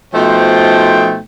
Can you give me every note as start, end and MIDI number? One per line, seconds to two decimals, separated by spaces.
0.14 1.20 47
0.14 1.20 53
0.14 1.20 57
0.14 1.20 63
0.14 1.20 72
0.14 1.20 79